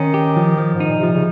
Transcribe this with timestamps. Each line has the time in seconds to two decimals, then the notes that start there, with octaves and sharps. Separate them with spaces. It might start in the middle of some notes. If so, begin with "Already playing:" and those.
Already playing: D#3 C#4
0.14 G4
0.36 F3
0.58 F3
0.74 G#2
0.80 D#4
0.88 A#2
0.99 C3 F3
1.13 C#3